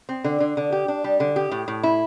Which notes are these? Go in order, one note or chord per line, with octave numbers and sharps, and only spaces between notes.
C4
D3
D3
D3
G4
D4
G3
D3
G4
A2
A2
E4